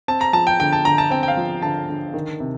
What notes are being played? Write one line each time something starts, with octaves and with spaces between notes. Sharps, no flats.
C4 A5
A#5
F3 A5
G5
D3 G5
A5
D3 A#5
A5
C4 G5
G5
F5
F3
D3 A5
D3
D#3
C3